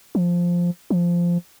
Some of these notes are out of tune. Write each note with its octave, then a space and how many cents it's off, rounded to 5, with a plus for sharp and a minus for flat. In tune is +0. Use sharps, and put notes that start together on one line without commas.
F3 +0
F3 -10